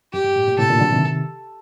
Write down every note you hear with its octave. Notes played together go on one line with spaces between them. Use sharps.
F#2 G4
G2
A2
A#2
A2 C3 A4
A#2 D3
D3 F#3
C3 D#3